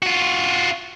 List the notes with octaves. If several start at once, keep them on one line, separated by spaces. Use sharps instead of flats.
F4 F#4